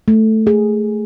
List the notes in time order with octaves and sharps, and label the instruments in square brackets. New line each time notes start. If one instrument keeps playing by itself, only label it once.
[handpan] A3
G#4